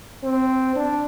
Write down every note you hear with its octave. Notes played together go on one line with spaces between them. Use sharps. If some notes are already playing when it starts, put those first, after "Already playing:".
C4
D4